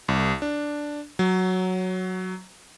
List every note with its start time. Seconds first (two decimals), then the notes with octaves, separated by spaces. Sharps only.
0.08 C2
0.42 D4
1.19 F#3